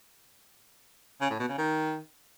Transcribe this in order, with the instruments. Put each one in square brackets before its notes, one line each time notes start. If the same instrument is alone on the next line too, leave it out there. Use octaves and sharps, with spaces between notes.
[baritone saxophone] C#3
A2
B2
C#3
D#3